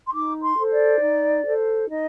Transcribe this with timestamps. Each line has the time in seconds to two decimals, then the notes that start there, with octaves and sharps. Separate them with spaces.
0.06 C6
0.13 D#4 D6
0.42 C6
0.57 A4 C5
0.72 D5
1.01 D#4
1.45 A4 C5
1.88 D#4 D#5